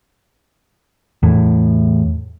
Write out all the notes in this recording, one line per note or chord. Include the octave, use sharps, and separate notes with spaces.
E2 A2